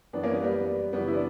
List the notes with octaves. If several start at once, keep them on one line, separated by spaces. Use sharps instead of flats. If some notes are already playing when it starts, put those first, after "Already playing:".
F#2 E3 B3 D4
A#3 C#4
G3 B3
G3 B3
F#2 C#3 E3 G3 B3
E4
B3 D4